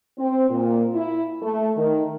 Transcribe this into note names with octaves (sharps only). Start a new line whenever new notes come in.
C4
A#2
E4
A3
D#3